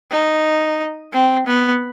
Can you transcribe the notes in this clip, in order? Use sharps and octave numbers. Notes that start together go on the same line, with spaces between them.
D#4
C4
B3